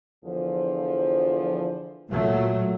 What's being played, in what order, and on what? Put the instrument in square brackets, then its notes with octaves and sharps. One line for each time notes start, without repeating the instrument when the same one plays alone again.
[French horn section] E2 D3 F3
[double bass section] A#2 F#3 A3